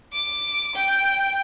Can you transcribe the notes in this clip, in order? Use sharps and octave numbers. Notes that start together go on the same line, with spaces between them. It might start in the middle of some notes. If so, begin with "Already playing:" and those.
D6
G5